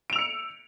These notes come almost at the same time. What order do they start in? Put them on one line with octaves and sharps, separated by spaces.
D7 F7 E6 C#7